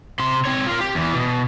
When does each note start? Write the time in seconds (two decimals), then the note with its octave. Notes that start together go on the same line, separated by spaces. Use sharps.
0.19 C3 C6
0.45 C4 C#5
0.67 F4 A#4
0.81 G4
0.95 E2 E3
1.15 B2